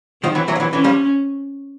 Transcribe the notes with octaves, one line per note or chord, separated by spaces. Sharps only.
D#3 F3 C4
E3 F#3
E3 F#3
F3
E3 F#3
D3 E3 C#4
F3 G3